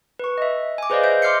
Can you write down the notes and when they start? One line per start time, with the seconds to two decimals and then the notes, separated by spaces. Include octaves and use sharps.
0.19 B4 C#6
0.38 D#5 E5
0.78 G#5 D6
0.90 G#4 B4 C5 D5 D#5 F5
1.04 D#5 E5 G6
1.22 C6 D6 F6 G6 C7 C#7